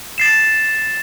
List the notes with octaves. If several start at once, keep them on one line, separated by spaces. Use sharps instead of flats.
A6 C7 E7